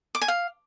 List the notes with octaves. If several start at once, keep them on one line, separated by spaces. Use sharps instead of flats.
D6
G#5
F5